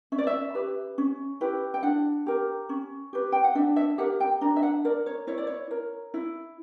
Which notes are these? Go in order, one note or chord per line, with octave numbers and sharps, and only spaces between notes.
C#4 E5
D5
E5
G4 B4
C#4
E4 G4 B4
G5
D4 F#5
G4 A#4
C#4
G4 B4
G5
F#5
D4 E5
E5
G4 A#4 F#5
G5
D4 A#5
E5
F#5
A#4 D5
C#5
E4 C#5
D5
C#5
A#4
E4